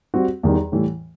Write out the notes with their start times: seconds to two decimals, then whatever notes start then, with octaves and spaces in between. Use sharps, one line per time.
0.14 G3 C4 F#4
0.43 E2 D#3 G3
0.72 A2 E3 G3